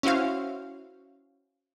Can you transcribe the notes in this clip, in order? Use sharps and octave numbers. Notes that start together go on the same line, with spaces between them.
C#4 E4 F#4 C5 F5